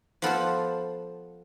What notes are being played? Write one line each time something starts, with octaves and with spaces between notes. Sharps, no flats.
F3 B3 F4 A4 C5